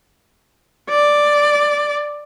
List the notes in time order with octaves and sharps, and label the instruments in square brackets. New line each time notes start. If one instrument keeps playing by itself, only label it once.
[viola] D5